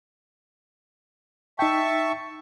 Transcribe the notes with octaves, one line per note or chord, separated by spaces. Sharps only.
D#4 E5 G5 A5 C#6